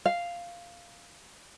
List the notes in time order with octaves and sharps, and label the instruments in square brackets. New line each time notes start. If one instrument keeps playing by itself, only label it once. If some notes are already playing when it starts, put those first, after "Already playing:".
[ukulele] F5